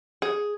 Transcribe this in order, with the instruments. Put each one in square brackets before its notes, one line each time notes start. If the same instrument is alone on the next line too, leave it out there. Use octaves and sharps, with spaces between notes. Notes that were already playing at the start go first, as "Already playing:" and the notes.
[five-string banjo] G#4